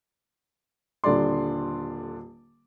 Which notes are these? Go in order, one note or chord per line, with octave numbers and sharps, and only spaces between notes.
D#1 D3 G3 D5 C6